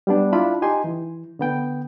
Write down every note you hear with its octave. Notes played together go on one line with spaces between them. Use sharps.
G3 B3 D4
D4 E4 F4 B5
D#4 G4 G#5 C6
E3
D3 B3 G5